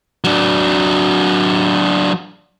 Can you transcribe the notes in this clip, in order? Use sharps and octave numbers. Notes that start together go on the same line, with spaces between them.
F#3 D4